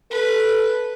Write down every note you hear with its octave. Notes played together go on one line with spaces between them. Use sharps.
A4 B4